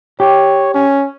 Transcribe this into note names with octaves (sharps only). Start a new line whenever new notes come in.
G4 C#5
C#4